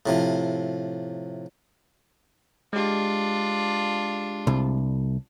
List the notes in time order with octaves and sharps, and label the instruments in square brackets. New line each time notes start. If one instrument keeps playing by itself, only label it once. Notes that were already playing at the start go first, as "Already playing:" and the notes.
[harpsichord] A2 C3 F3
[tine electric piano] G#3 G4 [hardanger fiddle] D4 F4
[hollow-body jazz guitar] C2